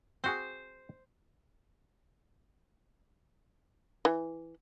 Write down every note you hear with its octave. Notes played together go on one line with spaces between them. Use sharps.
C4 F#4 G#4 C5
E3